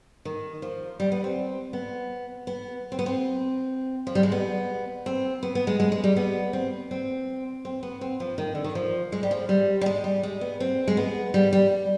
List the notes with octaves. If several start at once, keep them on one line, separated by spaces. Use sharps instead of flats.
D#3
F3
G3
B3
C4
B3
B3
C4
B3
C4
F3
G3
G#3
B3
C4
B3
B3
G#3
G#3
G#3
G3
B3
C4
C4
C4
B3
C4
F3
D#3
D3
D#3
F3
G#3
G3
F3
G3
G3
G#3
G3
G#3
B3
C4
G#3
B3
G3
G3